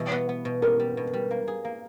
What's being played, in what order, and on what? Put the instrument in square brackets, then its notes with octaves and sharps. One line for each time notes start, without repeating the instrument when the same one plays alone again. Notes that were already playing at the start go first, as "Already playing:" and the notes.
Already playing: [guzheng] B2 E3 G3
B3
B3
B2
[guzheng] B3 [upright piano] A#4
[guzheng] G3
B2
G3
A#3
G#4
A#3